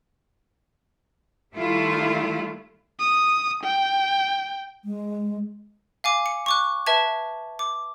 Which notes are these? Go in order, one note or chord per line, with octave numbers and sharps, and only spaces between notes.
D#3 G3 A3 E4 F4
D#6
G5
G#3
F5 G#5 D6
C#7
C#6 D6 F#6
B4 E5 A5 G#6
D6